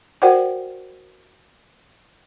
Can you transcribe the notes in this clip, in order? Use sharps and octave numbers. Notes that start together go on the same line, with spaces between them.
F#4 A#4 C5 D5 F#5 G5